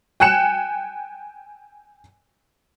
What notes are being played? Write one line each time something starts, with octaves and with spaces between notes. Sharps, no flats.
G5 G#5 F#6 C#7 E7